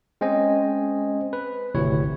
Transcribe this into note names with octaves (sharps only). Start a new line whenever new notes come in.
G#3 C4 C#4 C5 D#5 G#5
B4
G#1 D2 C3 E3 E4 C#5